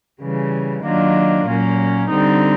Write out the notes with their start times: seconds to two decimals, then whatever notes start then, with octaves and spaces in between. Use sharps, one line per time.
0.21 C#3 E3 G3
0.84 D#3 F#3 A#3 D4 F4
1.46 A#2 F#3 A#3 C#4
2.09 D3 G3 C4 D#4